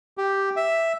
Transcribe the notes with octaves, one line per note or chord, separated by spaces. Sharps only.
G4
E5